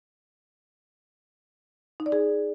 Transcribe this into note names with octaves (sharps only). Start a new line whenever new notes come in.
D#4
D5
G#4